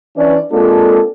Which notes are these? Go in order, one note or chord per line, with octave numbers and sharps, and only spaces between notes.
E3 C#4 D4 E4 B4 D5
G#3 A#3 C4 D4 F4 A4